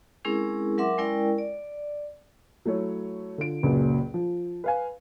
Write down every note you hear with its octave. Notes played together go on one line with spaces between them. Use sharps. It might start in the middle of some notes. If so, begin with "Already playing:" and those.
G#3 C4 C#4 E4 G#4 A#4
F#3 A#4 E5 F#5 C6 D6
G#3 C#4 E4 A#4 D5 G5
D5
F#3 A3 E4 C#5
D3 F4 D7
F#1 C#2 A#2 F#3
F3
B4 F5 G#5